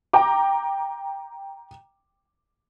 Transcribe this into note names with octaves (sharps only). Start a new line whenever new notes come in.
G5 A#5 D6